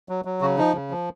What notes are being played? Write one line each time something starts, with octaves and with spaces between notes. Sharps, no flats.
F#3
F#3
C#3 F#4
F3 D#4
C#3
F3